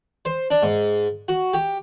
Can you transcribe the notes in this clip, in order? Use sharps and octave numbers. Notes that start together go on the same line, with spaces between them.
C5
D4
G#2
F#4
G4